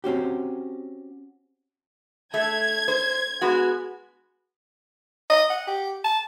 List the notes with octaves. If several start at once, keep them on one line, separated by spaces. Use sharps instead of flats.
C4 C#4 F#4 G4
A3 G#6
C5
G#3 B3 F#4
D#5
F#5
G4
A5